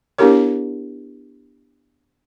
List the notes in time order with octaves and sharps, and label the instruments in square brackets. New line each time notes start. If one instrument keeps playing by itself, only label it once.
[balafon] B3 D4 E4 G4 A#4 C#5